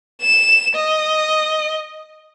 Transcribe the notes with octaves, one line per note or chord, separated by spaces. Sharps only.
E7
D#5